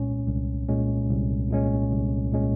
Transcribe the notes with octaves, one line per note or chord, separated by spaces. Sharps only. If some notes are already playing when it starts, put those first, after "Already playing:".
Already playing: C2 A#2 G#3 C#4
C2
A#2 G#3 C#4
C2
A#2 G#3 C#4
C2
A#2 G#3 C#4